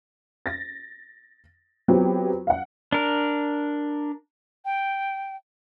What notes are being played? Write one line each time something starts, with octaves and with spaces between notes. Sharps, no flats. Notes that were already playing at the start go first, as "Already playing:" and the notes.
A6 A#6
F#3 B3 C4 F4 G4
F5 F#5
D4 A#4
G5